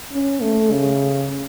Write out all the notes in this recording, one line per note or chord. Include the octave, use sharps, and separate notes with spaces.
C#4
A3
C#3